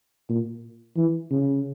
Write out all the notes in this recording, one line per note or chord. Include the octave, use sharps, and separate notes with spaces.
A#2
E3
C#3